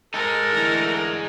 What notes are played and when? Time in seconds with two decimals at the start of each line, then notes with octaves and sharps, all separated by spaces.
0.14 G#3 D#4 A4 A#4
0.52 D3 E3 A3